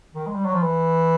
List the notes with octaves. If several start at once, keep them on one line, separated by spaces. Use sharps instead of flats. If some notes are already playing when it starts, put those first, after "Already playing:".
D#3
G#3
G3
F#3
F3
E3